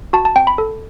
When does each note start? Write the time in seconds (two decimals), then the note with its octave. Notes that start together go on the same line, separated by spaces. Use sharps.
0.13 F#4 A5
0.25 A5
0.36 C4 G5
0.47 B5
0.58 A4